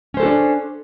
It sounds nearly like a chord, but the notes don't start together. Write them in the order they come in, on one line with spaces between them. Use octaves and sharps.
C#4 C5 A4 F#4 D4